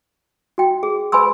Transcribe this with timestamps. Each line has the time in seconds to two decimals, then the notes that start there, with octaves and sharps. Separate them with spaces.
0.58 F#4 G5
0.83 G#4
1.12 B4 G#5 B5 C6 E6